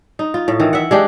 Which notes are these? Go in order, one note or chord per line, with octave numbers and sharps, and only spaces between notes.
D#4
F4
A2
D#3 E3
E5 F#5
G#3 D4 G4